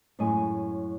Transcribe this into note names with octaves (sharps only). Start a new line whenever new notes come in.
F#2 A2 G#3 D#5 G#5